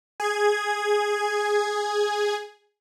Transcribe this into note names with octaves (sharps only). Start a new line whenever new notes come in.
G#4 G#6